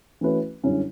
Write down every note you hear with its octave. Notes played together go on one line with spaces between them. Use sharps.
E3 A3 C#4 F#4 B4
F#2 D3 G3 C#4 E4